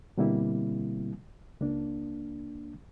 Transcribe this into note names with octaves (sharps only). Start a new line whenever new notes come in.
B2 D3 G3 A#3 C4 E4
C#2 A#3 D4